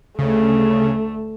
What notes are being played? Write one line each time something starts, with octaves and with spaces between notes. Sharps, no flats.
D2 C#3 A3